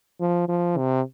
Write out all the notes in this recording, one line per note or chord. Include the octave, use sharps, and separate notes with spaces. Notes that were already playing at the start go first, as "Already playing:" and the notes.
F3
F3
C3